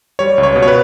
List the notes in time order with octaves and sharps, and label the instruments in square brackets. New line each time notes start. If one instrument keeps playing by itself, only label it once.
[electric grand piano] G3 C#5
C#2
C#5
B2
C#5
B4